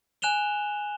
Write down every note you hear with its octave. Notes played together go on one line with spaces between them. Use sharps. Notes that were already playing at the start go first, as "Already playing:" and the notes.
G#5 F#6 E7 F7 G7